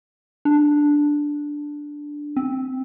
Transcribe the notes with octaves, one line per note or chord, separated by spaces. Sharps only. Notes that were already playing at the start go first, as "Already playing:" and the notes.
D4
C4